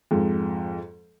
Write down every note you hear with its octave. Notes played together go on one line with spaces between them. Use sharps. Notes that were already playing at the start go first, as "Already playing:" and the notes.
F2 G#2